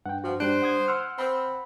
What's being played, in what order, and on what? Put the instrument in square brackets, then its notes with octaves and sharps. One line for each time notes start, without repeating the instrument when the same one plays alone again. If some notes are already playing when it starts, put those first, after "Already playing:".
[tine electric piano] G2 [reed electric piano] F#5 G5
[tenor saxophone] F3 [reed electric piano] F#4
[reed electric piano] G3 D4 [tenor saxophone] C5 [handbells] F#6 D7
[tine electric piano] F#5 D#6 G#6
[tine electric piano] F#5 [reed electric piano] C6 E6 F6
[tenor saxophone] C4 [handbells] B5